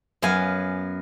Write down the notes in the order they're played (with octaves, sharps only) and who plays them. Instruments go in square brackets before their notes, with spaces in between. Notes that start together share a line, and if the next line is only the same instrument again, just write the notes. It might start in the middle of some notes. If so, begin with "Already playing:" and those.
[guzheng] F#2 B3 F5 G#5